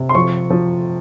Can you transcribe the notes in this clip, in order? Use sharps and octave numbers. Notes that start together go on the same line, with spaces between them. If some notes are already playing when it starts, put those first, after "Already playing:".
Already playing: C3
C6
F3 C#6
F3